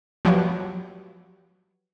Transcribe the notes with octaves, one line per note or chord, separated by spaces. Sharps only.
F3 F#3 F#4 G4 B4 C#5